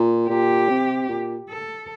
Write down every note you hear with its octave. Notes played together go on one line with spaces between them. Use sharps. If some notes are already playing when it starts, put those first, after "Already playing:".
Already playing: A#2
A#2 G4
C3
A#2
A4